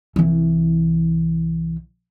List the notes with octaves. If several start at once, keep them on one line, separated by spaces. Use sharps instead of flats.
C2 E3